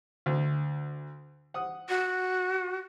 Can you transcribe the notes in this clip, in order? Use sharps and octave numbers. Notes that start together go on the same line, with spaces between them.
D2
F#5 D#6
F#4